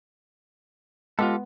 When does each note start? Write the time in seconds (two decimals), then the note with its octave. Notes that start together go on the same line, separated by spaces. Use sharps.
1.19 G#3 B3 F4 G4 A4